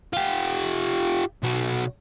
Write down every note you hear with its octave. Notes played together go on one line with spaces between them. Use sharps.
F4 G4
B1 F#4